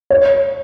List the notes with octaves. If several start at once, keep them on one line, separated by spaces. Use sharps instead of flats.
C#5